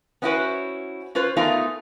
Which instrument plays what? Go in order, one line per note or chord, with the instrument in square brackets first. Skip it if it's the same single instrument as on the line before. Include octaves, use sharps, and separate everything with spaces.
[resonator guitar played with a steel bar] B3 C#4 E4 F#4 B4 C5
C#4 F4 B4 C5
A3 B3 D#4 F4 A#4 G#5